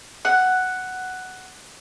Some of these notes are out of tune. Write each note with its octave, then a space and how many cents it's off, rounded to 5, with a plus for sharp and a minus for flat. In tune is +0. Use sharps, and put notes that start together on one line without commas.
F#5 +5